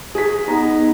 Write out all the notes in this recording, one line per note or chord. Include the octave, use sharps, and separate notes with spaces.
G#4 B6
B3 D#4 A#5